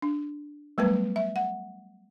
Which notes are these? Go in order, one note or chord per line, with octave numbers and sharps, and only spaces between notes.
D4
F#3 G3 A3 B3 B4
E5
F#5